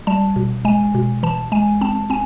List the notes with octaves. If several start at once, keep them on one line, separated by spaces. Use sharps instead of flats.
G3 A5
B2
G#3 G#5
B2
E3 A5
G#3 G#5
C4 A5
C4 G#5